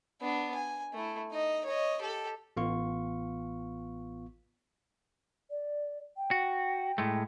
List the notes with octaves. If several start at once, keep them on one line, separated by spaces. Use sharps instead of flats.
B3 D4
G#5
A3 E4
D#4 D#5
C#5 D#5
G4 A4
A1 B3 F4 F5 C#6
D5
G5
F#4
A2 G#3 A3